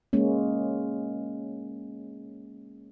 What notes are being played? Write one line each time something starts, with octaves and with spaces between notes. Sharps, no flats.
G#3 A#3 C#4